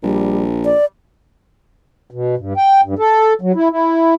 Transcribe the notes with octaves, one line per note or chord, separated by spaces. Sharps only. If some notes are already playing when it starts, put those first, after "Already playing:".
A#1 G3
D5
B2
G2
G5
G2
A4
F#3
E4
E4